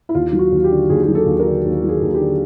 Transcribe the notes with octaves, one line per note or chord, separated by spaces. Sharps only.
E4
D#2 F4
F#3
F#4
D#2
G4
D3
D#2 G#4
G#4
F#3
A4
D#2
A#4
D3
D#2
F#3
G#4
D#2
G4
D3